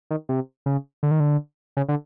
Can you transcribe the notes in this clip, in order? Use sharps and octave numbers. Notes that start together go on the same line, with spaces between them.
D#3
C3
C#3
D3
D#3
D3
C#3
D3